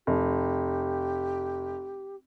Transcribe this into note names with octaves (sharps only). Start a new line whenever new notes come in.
F1 G4